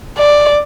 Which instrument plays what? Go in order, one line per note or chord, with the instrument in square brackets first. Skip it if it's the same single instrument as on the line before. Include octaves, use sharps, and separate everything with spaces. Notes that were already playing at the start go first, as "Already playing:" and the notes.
[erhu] D5